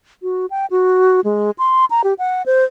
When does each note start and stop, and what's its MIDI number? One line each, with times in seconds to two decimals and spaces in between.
0.23 0.46 66
0.50 0.66 79
0.71 1.20 66
1.24 1.51 56
1.58 1.85 84
1.90 2.02 82
2.04 2.14 67
2.19 2.42 78
2.46 2.64 72